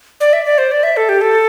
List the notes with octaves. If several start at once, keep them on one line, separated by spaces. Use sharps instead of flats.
D5
E5
D5
C5
D5
E5
A4
G4
A4